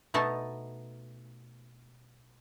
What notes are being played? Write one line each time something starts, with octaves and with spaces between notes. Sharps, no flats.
B2 A3 B3 D#4 A5